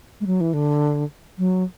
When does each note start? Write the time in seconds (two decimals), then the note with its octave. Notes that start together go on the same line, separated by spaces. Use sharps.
0.21 G#3
0.27 F#3
0.41 E3
0.53 D3
1.38 F#3